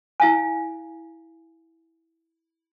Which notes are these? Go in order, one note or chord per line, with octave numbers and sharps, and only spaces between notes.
E4 F5 G#5